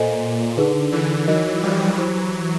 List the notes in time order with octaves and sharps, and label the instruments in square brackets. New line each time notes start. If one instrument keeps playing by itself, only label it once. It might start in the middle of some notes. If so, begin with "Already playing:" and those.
Already playing: [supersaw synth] A#2 [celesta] A4 C5 D#5 G#5
[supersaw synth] D3 [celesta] D#4 G#4 B4
[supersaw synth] D3 E3
[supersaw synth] E3 F#3 [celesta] D#4 F#4 A#4 D#5
[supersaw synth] F3 G3
[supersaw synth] E3 F#3 [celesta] E4 G4 C5